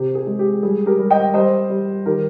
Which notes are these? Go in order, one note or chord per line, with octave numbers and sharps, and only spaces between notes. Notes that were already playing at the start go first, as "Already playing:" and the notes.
Already playing: C3 G4
G#4
G#3
G4
G3 G#4
G4 A#4
G3
D#5 G5
G3 C5 D#5
G3
D#3 G4 A#4